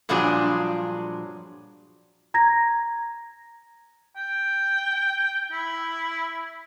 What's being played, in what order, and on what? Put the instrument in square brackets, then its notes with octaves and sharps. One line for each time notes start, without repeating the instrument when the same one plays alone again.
[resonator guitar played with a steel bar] G2 A#2 F3 F#3 D4 G#4
[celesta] A#5 G#6 A#6
[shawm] G5
E4